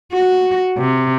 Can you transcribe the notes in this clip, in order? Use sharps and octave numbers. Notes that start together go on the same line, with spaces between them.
F#4
C3